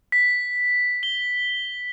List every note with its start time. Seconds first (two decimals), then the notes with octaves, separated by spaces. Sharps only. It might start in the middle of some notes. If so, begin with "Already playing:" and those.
0.12 B6
1.03 G7